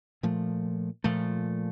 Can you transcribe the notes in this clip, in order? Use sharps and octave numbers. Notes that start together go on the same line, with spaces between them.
A#2 F3 A3
A#2 F3 A3